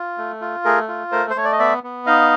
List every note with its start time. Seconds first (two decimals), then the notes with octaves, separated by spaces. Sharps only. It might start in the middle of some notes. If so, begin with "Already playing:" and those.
Already playing: F4
0.18 A3
0.41 F4
0.65 A3 G#4 A#4
0.88 F4
1.12 A3 A#4 C5
1.30 C5
1.36 A3 C#5
1.45 D5
1.52 D#5
1.59 B3 D5 E5
1.83 B3
2.06 D#4 D#5 F5